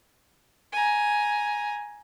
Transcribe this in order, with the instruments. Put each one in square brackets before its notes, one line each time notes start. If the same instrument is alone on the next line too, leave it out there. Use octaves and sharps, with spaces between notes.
[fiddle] G#5 A#5